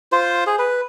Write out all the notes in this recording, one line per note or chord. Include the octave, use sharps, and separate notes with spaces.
F4 C5
G#4
B4